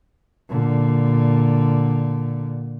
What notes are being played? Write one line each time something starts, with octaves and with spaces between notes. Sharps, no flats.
A#2 D3